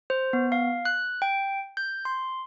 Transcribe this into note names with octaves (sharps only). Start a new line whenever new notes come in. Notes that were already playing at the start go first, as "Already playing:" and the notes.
C5
B3
F5
F#6
G5
G6
C6